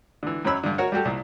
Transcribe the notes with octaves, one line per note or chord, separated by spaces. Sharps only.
D3 E3
F#2 F#3 C#4 C#5 B5 E6
G2 D3
F#4 A#4 C#5 F#5
G3 F#4 G4 A4
C2 A#2